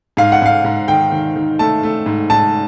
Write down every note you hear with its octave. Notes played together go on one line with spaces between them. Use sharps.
G#2 F5
F#5
G#2 F5
G#2
D#3 G5
D#3
D#3
A3 A5
A3
G#2
G#2 A5